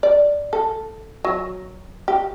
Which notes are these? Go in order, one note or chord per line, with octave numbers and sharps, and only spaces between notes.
D5
A4
F#3
G4